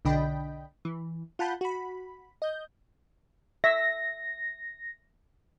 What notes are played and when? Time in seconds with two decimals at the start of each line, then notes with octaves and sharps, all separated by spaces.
0.05 B1 D3 D4 D#5 G5 B5
0.85 E3
1.39 F4 F#5 A5 B5 G6
1.61 F#4 B5
2.42 D#5 G6
3.64 E5 A#6